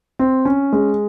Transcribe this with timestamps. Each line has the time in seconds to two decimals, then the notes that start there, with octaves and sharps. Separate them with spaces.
0.19 C4
0.45 C#4
0.73 G#3